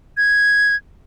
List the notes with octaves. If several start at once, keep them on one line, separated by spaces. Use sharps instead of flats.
G#6